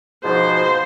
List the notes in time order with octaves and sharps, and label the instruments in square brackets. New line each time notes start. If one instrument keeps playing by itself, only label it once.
[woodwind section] G#2 B2 F3 [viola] C5